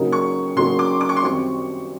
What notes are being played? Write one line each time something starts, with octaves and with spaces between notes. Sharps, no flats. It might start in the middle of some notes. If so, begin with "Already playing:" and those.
Already playing: C#3 F#3 A#3 D#4 G#4
C#6
C#3 F#3 A#3 D#4 G#4 C6
D6
D6
C#6
C6
F#2 D#3 G3 C4 C#6